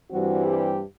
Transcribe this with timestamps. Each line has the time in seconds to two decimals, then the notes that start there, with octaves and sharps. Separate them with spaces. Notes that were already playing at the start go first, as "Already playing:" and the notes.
0.11 G2 E3 G3 C4 F#4
0.47 G4